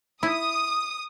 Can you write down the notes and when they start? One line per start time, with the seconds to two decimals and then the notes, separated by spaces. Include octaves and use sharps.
0.23 E4 D#6